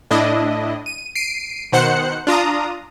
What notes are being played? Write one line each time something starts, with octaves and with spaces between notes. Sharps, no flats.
A2 D4 E4 D#5
D#7
C7 D7 D#7
B2 D#3 C5 F#5 F#6 C#7
D4 F4 A#5 D#6